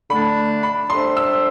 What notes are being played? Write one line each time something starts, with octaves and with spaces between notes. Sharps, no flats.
D3 A3 D4 B5
B5
G3 D4 A4 C5 E5 C6
E6